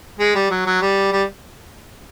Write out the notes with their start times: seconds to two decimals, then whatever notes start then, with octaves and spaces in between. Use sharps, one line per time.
0.20 G#3
0.35 G3
0.51 F#3
0.66 F#3
0.82 G3
1.13 G3